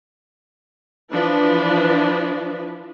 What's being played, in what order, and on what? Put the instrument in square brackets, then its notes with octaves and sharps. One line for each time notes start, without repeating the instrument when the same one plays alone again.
[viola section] E3 F3 D4 B4